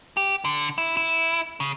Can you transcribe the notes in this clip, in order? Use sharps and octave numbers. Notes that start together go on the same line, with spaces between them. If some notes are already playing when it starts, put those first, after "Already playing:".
G4
D3
E4
E4
C#3